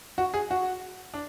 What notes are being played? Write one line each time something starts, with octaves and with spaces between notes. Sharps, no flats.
F#4
G#4
F#4
D4